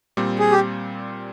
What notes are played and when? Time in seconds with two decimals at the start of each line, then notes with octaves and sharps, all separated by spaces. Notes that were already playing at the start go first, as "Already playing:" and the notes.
0.17 A#2 G3 C4
0.39 G#4
0.52 G4